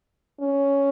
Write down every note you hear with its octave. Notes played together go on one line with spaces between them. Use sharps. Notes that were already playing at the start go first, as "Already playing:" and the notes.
C#4